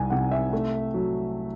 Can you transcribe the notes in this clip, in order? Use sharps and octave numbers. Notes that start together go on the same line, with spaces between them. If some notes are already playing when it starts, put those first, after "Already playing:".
Already playing: C2 G#5
C3 F#5
E5
A3
F#3